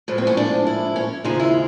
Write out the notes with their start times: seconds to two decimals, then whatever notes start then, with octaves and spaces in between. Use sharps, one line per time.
0.08 A2 F3 G#3
0.18 C4
0.27 C#4
0.37 D4
0.67 E4
0.96 C#4
1.24 D#2 C#3 F3 G#3 D#4
1.40 E4